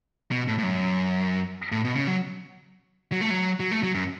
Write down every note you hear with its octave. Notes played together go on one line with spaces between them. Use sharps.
B2
A2
A2
F#2
A2
B2
C#3
F#3
F#3
A3
F#3
F#3
A3
F#3
F#2